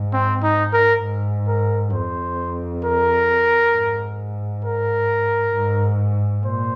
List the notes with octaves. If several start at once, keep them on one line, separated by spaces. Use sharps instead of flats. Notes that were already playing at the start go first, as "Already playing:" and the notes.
Already playing: G#2
C4
D#4
A#4
G#2
A#4
F2 C5
A#4
G#2
A#4
G#2
A#2 C5